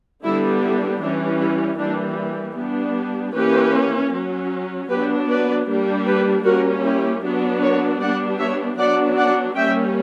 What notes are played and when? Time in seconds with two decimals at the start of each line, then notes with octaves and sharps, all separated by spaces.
0.23 D3 G3 B3 D4 E4
0.62 E4
1.01 E3 G3 C#4 D4
1.40 E4
1.78 E3 G3 A#3 D4
2.56 G3 B3 D4
3.33 E3 A#3 C#4 G4 B4
4.12 F#3 C#4
4.89 F#3 B3 D4 G4 B4
5.29 B4 D5
5.67 G3 A#3 D4
6.06 G4 B4
6.44 G3 A#3 C#4 F#4 A#4
6.84 E4 G4
7.23 F#3 B3 D4
7.62 A#4 C#5
8.00 G3 B3 D4 D5 F#5
8.39 C#5 E5
8.78 F#3 B3 D4 D5 F#5
9.17 D5 F#5
9.56 G3 A#3 C#4 E5 G5